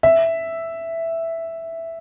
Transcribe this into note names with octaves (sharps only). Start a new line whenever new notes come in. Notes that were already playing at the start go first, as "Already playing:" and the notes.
E5